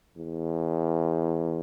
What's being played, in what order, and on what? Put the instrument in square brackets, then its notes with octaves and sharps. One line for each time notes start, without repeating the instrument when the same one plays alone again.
[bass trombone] E2